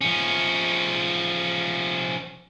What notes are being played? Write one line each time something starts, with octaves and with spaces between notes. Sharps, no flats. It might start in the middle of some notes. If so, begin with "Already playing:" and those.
F3 C#4